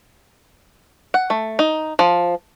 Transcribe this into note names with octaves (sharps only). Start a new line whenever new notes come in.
F#5
A3
D#4
F3